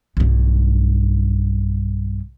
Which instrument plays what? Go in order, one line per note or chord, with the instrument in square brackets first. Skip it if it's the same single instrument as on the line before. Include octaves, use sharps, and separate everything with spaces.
[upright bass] B1 G2